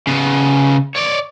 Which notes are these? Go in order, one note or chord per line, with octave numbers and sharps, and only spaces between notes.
C#3 B3
C#5 D5